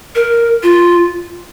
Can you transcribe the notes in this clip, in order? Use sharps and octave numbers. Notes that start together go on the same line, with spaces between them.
A#4
F4